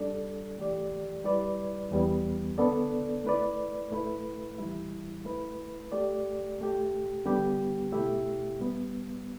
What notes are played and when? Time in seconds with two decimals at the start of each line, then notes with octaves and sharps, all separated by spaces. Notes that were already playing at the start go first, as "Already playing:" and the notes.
Already playing: G3 D4 A4 D5
0.57 E3 A3 G4 D5
1.24 G3 E4 B4 D5
1.91 E2 E3 G3 B3
2.58 D3 B3 D4 A4 D5
3.24 A3 E4 B4 D5
3.91 A2 A3 E4 B4
4.58 A2 E3 G3 E4
5.25 A3 E4 B4
5.92 A3 G4 D5
6.59 A2 A3 G4
7.25 D3 G3 B3 G4
7.92 B2 A3 E4 G4 E5
8.59 A2 G3 B3